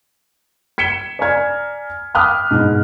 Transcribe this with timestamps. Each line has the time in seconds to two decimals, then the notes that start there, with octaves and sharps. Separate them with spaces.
0.78 G#6 B6 C#7 E7 G7
1.19 D5 G#5 A#5 F6 G#6
2.14 G5 B5 D6 D#6 F6 F#6
2.51 G#2 B2